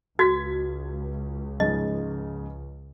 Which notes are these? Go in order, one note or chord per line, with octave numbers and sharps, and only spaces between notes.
C#2 F#4 G#6 B6
G#2 C#3 F3 D#5